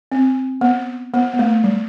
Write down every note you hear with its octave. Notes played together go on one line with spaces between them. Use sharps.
C4
B3
B3
B3
A3
G3